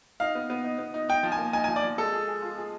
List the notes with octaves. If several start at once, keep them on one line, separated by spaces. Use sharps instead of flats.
D#4 F5
B3
B3
D#4
B3
D#4
D#4 G5
F3
G#5
A#3
D#4 G#5
G#5
F3
D5
F3
G#3 A4
G#4
G#4
F4
G#4